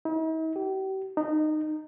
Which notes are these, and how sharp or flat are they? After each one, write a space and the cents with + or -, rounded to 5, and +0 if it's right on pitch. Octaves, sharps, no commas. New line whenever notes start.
D#4 +45
G4 -40
D#4 -20